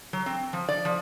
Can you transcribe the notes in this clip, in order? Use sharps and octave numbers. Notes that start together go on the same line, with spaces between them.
F#3
C4
F3
D5
F3